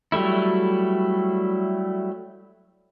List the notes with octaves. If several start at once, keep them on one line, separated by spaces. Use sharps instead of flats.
F#3 G3 A3 E4